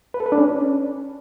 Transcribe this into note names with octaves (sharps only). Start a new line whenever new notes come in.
B4
A4
B4
D4
C#4